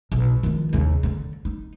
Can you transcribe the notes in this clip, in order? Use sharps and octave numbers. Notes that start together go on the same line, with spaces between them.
B1
D#3 F3
D#2 C#3
D3
D#4